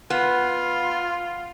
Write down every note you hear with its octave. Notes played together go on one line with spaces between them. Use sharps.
B3 F4